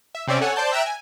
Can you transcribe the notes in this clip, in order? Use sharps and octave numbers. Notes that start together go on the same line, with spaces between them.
E5
C3 C4 C#4 D5 E5
A4 C#5 F#5 G#5
C5 D5 A5 G6
E5 G5 A#5 E6 F#6 D7
G#5